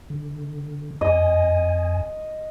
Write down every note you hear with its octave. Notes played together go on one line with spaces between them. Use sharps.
D3
F2 D#5 G#5